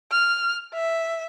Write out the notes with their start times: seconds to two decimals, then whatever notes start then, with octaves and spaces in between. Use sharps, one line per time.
0.11 F6
0.74 E5